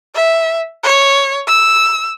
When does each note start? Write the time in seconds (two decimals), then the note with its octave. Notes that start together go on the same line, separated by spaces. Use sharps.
0.15 E5
0.83 C#5
1.47 E6